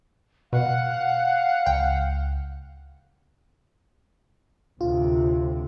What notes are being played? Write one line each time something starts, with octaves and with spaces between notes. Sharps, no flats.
B2 F5 F#5
C#2 G5
D2 A2 C3 F4